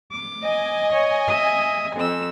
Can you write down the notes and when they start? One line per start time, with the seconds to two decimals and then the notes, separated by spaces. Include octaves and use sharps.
0.12 D6
0.43 D#5 G#5
0.93 C#5
1.28 E5 D#6
1.96 F2 C4 E6